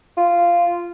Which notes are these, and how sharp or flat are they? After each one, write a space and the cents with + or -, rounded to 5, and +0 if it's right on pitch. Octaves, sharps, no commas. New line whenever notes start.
F4 -10